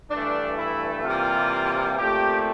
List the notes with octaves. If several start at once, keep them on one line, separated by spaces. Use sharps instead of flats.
G2 E3 A3 D4
E4
C3 E3 G3 A#3 F4
A#2 A3 C4 G4